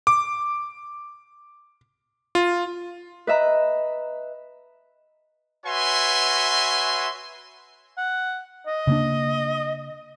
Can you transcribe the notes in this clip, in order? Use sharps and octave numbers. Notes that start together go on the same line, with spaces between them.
D6
F4
B4 D#5 E5 A#5
F#4 B4 C#5 E5 G#5 C6
F#5
D#5
C#3 A#3 D4